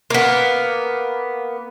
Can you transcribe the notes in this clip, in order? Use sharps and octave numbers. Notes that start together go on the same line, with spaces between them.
A#3 B3